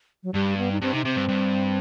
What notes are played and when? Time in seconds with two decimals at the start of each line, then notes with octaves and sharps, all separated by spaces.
0.23 F#3
0.34 G2 G3
0.57 B3
0.72 D#4
0.81 G2 C4
0.93 C3 D#4
1.05 C3 C4
1.16 G2
1.28 G2